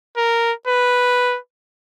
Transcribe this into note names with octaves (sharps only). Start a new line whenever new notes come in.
A#4
B4